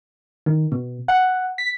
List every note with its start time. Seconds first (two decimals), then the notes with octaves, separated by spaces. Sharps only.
0.46 D#3
0.72 B2
1.08 F#5
1.58 B6